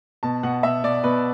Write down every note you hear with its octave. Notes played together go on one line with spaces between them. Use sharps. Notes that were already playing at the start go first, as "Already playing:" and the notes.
B2 A5
B2 F#5
B2 E5
B2 D5
B2 B4